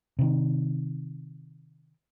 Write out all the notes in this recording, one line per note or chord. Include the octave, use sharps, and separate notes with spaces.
C3 D#3